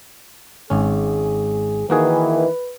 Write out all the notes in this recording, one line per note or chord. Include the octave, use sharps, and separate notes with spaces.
G#1 C#4 G#4
D#3 E3 A#3 F#4 G#4 B4